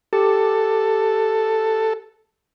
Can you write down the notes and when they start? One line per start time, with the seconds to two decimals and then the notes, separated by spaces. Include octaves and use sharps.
0.13 G4 A4